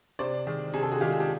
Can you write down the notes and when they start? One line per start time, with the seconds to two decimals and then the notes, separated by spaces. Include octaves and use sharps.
0.19 C3 C5 D5
0.46 D#3 G#3
0.73 C3 G#4
0.83 A4
0.91 F#4 G#4
1.00 D#3 G#3 F4 G4
1.12 G#4
1.20 G4